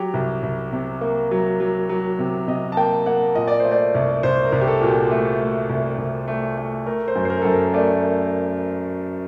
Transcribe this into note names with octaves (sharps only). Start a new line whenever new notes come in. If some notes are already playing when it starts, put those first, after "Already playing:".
Already playing: F#3 G4
C2
C2
C3
A#3
F#3
F#3
F#3
C3
C3 D#5
A5
A#3 G5
A#3 F#5
A#2 D#5
D5
A3 C5
D5
C2
C2 C5
A#4
C2
G4
A4
A#2 F#4
G4
A3
A3
C2
C2
A3
A3
A3 A#4
C5
F#2
C5
A#4
F#2 A4
A#4
A3 D5